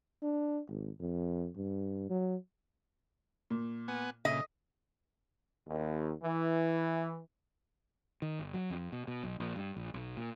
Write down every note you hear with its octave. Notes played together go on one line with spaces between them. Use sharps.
D4
G#1
F2
G2
F#3
A#2
B3 F#5 G#5
A#2 C#3 D#5 B6
D#2
E3
D#3
G1
F#3
F2
B2
B2
B1
A#1
G2
A#1
B1
A#2